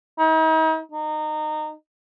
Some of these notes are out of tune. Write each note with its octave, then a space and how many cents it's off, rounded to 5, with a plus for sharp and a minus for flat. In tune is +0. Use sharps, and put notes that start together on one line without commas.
D#4 +40
D#4 -25